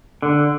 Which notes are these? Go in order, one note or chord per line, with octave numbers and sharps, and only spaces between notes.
D3